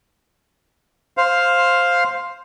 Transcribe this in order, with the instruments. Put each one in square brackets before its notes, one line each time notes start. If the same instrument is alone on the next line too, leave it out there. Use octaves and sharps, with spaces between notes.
[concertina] C5 F5